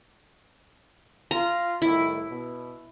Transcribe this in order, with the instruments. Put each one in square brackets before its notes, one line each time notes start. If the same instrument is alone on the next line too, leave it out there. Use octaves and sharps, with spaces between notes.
[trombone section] F4 [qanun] A#5
[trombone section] C2 A2 D#3 [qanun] E4
[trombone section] B2